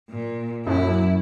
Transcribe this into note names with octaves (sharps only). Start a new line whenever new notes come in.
A#2
F#2 E4